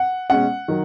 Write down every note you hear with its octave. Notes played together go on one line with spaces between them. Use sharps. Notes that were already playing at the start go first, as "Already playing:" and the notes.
Already playing: F#5
B2 G#3 C#4 F#5
D#3 F#3